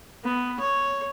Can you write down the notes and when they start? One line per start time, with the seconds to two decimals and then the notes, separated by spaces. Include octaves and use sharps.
0.24 B3
0.59 C#5